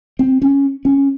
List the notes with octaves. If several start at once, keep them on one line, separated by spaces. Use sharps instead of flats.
C4
C#4
C#4